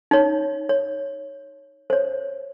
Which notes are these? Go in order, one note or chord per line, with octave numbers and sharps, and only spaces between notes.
D#4 C#5
C#5
C5 C#5